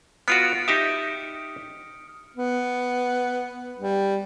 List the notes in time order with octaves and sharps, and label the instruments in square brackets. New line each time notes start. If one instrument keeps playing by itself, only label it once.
[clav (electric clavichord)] B3 F4 F#4 [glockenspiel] F6 C#7 D7
[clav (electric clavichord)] D#4 G4 E5 [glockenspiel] D#6
[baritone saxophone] B3
G3